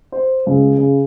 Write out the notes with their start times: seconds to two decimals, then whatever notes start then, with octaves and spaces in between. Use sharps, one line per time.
0.12 C5
0.46 C#2
0.78 C#3